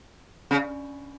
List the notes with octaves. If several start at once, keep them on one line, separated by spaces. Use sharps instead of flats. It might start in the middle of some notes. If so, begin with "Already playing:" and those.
C#3